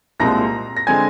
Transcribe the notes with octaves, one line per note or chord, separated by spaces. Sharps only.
C2 A#2 G#3 C4 A#5 A#6
A#6
D3 G#3 C4 G#5 G#6